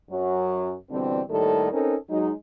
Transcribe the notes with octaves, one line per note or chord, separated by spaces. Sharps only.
F#2 F#3
B2 D3 E3 G3 C4
D#2 A2 D#3 G3 A4
C4 C#4 D#4 A4 A#4
F#3 G#3 D#4